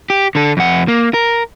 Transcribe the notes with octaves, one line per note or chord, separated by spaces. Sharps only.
G4
D3 A4
F2 F#5
A#3
A#4